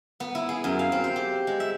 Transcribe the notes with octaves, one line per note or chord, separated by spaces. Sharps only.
B3
E4
G#4
F#2
F5
C4
C5
G4
G#3
E5